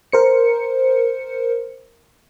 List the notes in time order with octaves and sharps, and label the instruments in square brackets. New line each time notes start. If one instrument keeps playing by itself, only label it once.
[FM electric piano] A#4 C5 C#7